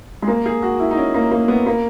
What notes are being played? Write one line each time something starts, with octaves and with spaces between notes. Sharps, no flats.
G#3
A#3
G#4
F#4
E4
D#4
C#4
A#3
A#3
B3
A#3